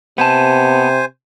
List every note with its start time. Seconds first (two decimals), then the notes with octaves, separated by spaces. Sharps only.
0.18 C3 B3 C5 G#5 A5